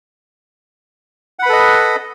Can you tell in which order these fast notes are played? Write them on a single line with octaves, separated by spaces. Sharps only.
F#5 B5 B4 A4 D#5